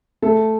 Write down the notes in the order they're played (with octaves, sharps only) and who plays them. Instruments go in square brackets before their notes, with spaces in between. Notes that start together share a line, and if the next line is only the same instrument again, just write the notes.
[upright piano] A3 A4